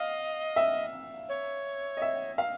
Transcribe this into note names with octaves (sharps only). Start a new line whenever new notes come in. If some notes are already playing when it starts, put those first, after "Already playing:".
Already playing: D#5 F5
E5
C#5
D#5
E5
F5